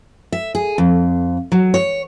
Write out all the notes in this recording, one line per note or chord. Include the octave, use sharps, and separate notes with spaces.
E5
G#4
F2
F#3
C#5